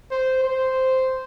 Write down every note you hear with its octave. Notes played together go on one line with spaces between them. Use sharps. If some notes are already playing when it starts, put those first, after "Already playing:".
C5
C5